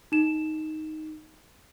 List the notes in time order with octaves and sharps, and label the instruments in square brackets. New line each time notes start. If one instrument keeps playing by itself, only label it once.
[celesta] D#4 E7